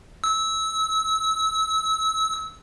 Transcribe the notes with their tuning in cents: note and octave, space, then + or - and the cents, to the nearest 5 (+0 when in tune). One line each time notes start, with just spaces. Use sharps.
E6 -25